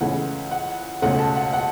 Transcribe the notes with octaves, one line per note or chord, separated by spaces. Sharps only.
C#2 C#3 E3 A3 C#4 F#5
F#5
C#2 B2 A3 C#4 F#5
A5
F#5
F#5